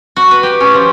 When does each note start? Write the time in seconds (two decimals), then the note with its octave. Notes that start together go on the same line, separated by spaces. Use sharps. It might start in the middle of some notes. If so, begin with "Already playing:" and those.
0.16 F#4
0.31 B4
0.43 G4
0.60 C#4
0.74 F3